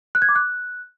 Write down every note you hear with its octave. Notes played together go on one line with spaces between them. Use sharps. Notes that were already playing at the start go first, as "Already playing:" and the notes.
F#6
G#6
D6
F#6